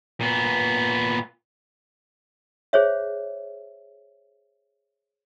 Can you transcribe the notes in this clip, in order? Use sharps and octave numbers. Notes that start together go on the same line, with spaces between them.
A#2 B3
G#4 C5 C#5 E5